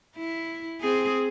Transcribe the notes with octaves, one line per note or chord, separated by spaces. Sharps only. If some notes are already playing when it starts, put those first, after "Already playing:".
E4
C4 G#4